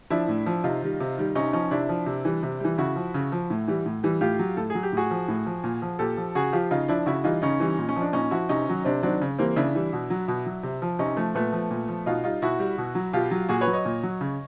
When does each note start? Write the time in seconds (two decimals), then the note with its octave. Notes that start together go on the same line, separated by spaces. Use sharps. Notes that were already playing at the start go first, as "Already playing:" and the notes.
0.10 F3 D4 E4
0.28 A2
0.46 F3
0.64 C3 D#4 F4
0.82 D#3 G3
1.00 C3
1.18 D#3 G3
1.35 C3 C#4 D#4
1.53 F3 C#4 D#4
1.71 C3 D4 E4
1.89 F3
2.06 C3
2.25 E3 G3
2.43 C3
2.60 E3 G3
2.78 C#3 E4 F#4
2.96 F3
3.14 C#3
3.32 F3
3.50 A2
3.68 E3 G3
3.86 A2
4.03 E3 G3
4.21 A2 F4 G4
4.39 F#3
4.57 A2 A4
4.70 F#3 G#4
4.83 G4
4.92 A2 F#4 G#4
5.11 F3
5.28 A2
5.46 F3
5.64 A#2
5.82 F3
5.99 A#2 G4 A4
6.17 F3
6.35 C#3 F#4 G#4
6.52 F3 F4 G4
6.71 C#3 D#4 F4
6.88 F3 D4 E4
7.06 C#3 E4 F#4
7.24 E3 G3 D#4 F4
7.42 C#3 C#4 D#4
7.60 E3 G3
7.78 A#2
7.89 C#4
7.96 F3
8.01 D4
8.13 A#2 C#4 D#4
8.31 F3 E4 F#4
8.49 C3 C#4 D#4
8.67 D#3 F#3
8.84 C3 C4 D4
9.03 D#3 F#3 C4 D4
9.21 C#3
9.38 E3 G3 A#3 C4
9.56 C#3 D4 E4
9.75 E3 G3
9.93 B2
10.10 F#3
10.28 B2
10.46 F#3
10.63 C3
10.82 F3
10.99 C3 C#4 D#4
11.17 F3 A3
11.35 A#2 A3 B3
11.53 F3
11.71 A#2
11.88 F3
12.06 B2 D#4 F4
12.24 G3 D#4 F4
12.42 B2 E4 F#4
12.59 G3
12.78 B2
12.95 F#3
13.13 B2 F4 G4
13.31 F#3
13.49 A#2 F#4 G#4
13.61 B4 C#5
13.67 F#3
13.73 C#5 D#5
13.85 A#2
14.03 F#3
14.21 C#3